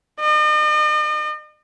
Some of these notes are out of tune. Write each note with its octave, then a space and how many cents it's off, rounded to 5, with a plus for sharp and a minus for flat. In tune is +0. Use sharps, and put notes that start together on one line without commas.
D#5 -45